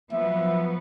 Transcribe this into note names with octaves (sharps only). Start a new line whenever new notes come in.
F3 F#3 B3 E5